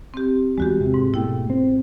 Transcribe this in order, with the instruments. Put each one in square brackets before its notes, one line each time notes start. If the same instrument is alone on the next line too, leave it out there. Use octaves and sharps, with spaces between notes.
[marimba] C4 G4
[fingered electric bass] E2 G3 [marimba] G#3 F#4 G4
[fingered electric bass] C3
[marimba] G#2
[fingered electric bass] B2 A3 [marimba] E4 G5
[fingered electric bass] C4